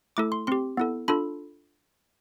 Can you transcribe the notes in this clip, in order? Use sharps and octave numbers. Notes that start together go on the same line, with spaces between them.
A3 E4 A4 D6
C6
C4 G4 C6
B3 E4 A4
D4 F4 A4 B5